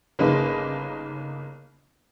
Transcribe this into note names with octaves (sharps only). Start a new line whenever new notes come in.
G1 C#3 A#3 D#4 B4 D#5